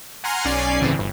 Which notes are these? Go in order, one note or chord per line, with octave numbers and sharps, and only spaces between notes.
F#5 G#5 A#5 C6 F6
B1 C#4 D5 G#5 C7
D2 A2 C#3 E3 C4
G1